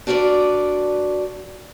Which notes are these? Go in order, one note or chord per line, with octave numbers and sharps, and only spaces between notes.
D4 F#4 A#4 B4 D5